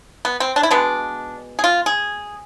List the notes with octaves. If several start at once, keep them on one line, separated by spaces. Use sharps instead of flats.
B3
C4
D4
E4
B2 G#3 B3 D4
G#4
F4
G#4